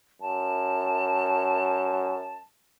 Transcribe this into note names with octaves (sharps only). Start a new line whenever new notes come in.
F#2 A5